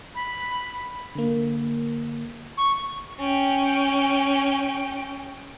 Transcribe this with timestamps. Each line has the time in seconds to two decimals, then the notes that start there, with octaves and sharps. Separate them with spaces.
0.15 B5
1.15 D3 A#3
2.57 C#6
3.19 C#4 G5